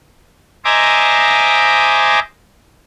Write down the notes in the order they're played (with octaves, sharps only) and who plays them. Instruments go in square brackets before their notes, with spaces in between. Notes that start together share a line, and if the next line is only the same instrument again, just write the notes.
[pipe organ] C5 D#5 E5 G#5 A#5 D6